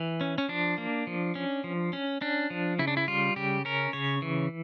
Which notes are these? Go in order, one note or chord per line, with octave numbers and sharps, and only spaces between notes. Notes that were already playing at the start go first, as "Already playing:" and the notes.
Already playing: E3
C#4
C#4
F3 D4
A#3
F3
C#4
F3
C#4
C#4 D4
F3
C#3 E4
D4
E4
G3 F4
C#3 G4
C#4 A#4
C#3 C#5
E3